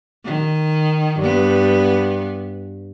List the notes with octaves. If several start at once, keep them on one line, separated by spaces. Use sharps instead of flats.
D#3
G2 B3